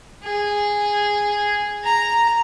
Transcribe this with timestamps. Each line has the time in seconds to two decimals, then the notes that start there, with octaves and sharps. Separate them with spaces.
0.23 G#4
1.84 A#5